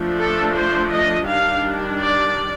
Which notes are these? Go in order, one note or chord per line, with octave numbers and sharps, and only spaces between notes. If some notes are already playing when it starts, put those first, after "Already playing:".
Already playing: F3 A3 D4
A4
C5
D#5
D#3 G3 D4 F5
D5